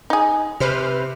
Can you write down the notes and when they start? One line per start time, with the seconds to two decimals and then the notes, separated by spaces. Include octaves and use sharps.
0.10 D#4 G#4
0.60 C3 B4 C5 F6